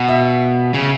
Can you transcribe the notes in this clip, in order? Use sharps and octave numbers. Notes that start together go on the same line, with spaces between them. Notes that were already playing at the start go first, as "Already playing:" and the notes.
Already playing: B2 F#5
E5
C#3